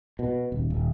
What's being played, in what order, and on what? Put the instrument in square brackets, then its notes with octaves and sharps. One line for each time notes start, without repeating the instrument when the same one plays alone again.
[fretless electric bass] B2
D#1
D#1